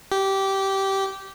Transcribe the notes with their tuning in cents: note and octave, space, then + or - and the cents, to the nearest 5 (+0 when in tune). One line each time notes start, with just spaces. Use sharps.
G4 -15